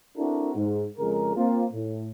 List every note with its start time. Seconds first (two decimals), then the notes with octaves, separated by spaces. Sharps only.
0.17 C4 D4 E4 F#4 A4 A#4
0.56 G#2
0.98 F2 C#3 G#3 G#4 A#4
1.37 A#3 C4 F4
1.73 A2